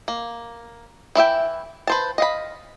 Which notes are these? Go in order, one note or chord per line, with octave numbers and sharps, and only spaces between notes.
A#3
E3 E4 E5 G5
B4 C5 A5
D#5 F5 B5